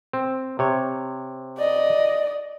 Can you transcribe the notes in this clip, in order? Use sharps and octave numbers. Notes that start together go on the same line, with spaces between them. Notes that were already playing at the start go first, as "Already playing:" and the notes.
C4
C3 C#5
D5 D#5